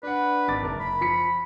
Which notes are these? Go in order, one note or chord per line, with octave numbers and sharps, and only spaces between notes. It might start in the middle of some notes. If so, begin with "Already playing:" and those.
D4 B4 F#5
G#1 D6 A6
F#1 A#4 A5
B5
F3 B6 C#7